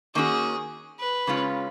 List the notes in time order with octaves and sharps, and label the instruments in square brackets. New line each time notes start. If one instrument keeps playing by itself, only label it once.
[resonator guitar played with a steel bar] D#3 A#3 C#4 F#4 [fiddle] G#4
[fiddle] B4
[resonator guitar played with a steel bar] C#3 G#3 C#4 F4